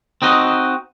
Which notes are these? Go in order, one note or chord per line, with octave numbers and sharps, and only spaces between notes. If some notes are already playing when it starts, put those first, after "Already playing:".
C4 D#4 F#4 D#5